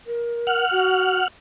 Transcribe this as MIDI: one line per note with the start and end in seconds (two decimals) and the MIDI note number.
0.06 0.64 70
0.47 1.28 78
0.47 1.28 89
0.71 1.20 66